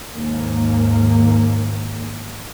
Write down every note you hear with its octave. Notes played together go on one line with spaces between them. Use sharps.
D#2 G#2 A#3